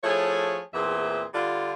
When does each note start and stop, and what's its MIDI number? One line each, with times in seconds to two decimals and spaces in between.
0.03 0.60 53
0.03 0.60 57
0.03 0.60 64
0.03 0.60 68
0.03 0.60 73
0.73 1.22 40
0.73 1.22 46
0.73 1.22 52
0.73 1.22 60
0.73 1.22 68
0.73 1.22 76
1.34 1.73 50
1.34 1.73 55
1.34 1.73 62
1.34 1.73 65